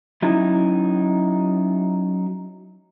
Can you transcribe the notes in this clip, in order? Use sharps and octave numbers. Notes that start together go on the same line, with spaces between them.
F#3 C#4 D#4 E4